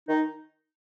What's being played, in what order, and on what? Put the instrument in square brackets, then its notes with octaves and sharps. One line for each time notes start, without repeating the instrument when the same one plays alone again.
[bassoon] D#3 [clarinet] D#4